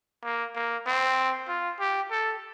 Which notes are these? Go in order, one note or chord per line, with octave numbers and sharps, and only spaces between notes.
A#3
A#3
C4
F4
G4
A4